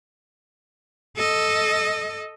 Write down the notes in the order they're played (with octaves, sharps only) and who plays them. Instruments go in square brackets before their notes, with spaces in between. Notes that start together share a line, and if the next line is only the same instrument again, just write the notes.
[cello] A4 D#5